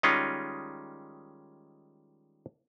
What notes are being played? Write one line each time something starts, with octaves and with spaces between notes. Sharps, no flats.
D#3 G3 G#3 C#4 D#4 F4